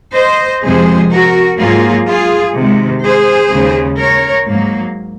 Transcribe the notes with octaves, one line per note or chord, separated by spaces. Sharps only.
C5 D#5
F2 C3 F3 G#3 G#4 C5
F#4 A#4
G#2 F#3 A#3 F4 G#4
F4 G#4
C3 D#3 G#3
G#4 C5
D#2 C#3 G#3
A#4 C#5
G#2 F#3 A#3